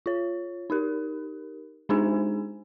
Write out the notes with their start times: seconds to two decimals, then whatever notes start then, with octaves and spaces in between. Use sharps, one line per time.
0.06 F4 C#5
0.70 D#4 G4 A#4
1.89 G#3 D4 D#4 G#4 C5 G#5